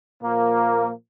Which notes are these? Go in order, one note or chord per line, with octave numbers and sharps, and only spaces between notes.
A#2 F3 A#3